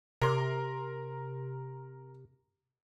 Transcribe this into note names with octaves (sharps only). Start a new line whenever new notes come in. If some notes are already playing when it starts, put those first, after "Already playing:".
C3 A#4 C6